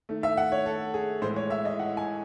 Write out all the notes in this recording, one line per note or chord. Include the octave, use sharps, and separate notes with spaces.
D#3 A3
E5
F#5
C#5
A4
G#4
A2 E3 G#3 C5
C#5
E5
D#5
F#5
G#5